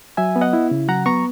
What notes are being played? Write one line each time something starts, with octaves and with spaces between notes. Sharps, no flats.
F#3 E5 G#5
B3
D#5 F#5
E4
C#3
F#3 F#5 A#5
B3 A#5 C#6